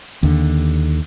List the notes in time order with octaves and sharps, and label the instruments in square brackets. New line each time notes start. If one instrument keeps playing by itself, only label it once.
[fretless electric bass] D#2 D3